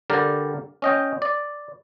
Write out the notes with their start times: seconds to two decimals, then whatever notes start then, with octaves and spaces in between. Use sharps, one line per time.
0.10 D3 G3 G4 A#4 D5
0.82 C#4 D#5 G5
1.22 D5